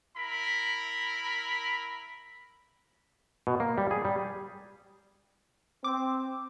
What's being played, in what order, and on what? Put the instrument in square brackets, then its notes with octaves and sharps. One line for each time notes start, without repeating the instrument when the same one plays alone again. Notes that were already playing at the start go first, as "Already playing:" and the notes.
[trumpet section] E4 A#4 B5
[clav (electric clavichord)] B2
A#3
G3
G#4
G3
[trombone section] C4 [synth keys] D6